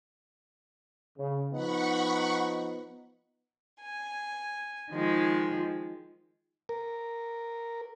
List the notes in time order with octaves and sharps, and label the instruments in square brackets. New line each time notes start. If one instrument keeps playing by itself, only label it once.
[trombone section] C#3
[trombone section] F3 B3 D#4 [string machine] F#5 B5 C#6
[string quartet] G#5
D#3 F3 G#3
[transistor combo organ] A#4